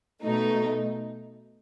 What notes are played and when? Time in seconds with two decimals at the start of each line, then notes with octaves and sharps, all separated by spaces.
0.23 B2 A3 D#4